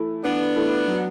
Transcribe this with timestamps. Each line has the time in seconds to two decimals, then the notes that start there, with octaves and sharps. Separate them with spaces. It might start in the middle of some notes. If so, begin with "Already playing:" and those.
Already playing: E3 A3 E4
0.23 E3 B3 D4
0.56 A3 E4
0.88 F#3